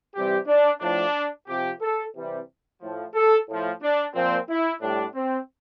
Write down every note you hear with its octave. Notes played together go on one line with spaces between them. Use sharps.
C3 E3 G3 G4
D4
A2 F3 D4
C3 F3 G4
A4
C3 E3 G3
A2 F3
A4
A2 F3
D4
A#2 F3 C4
E4
A2 G3 D4
C4